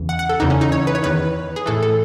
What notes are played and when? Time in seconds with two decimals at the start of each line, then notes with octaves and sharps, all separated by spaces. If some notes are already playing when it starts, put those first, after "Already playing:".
Already playing: E2 C#3 E3
0.09 F#5
0.19 F#5
0.29 A4
0.40 E2 C#3 E3 D#4
0.50 C#4
0.61 D#4
0.72 C#5
0.87 B4
0.95 C#5
1.03 E2 D#3 B4
1.56 G#4
1.66 A2 E3 A4
1.83 A4